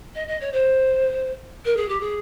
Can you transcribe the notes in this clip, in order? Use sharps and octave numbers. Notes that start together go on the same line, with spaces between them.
D#5
D#5
C#5
C5
A#4
G#4
G4
G#4